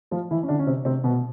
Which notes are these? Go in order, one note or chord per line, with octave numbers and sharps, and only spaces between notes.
F3 F4
E3 E4
C#4
D3 D4
C#4
C3 C4
C3 C4
B2 B3